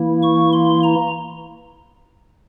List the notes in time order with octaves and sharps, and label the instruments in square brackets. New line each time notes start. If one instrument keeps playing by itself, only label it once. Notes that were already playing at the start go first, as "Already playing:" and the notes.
Already playing: [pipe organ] E3 A#3 E4
C#6
C6
A#5